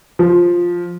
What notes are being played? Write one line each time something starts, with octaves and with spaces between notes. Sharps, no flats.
F3